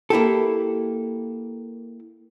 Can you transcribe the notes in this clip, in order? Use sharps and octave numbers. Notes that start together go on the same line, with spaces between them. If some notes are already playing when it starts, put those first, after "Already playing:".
A#3 E4 G4 A4